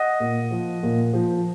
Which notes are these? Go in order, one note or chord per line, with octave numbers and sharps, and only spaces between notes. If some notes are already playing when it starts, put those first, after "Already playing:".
Already playing: D#5 F#5
A#2
F3
A#2
F3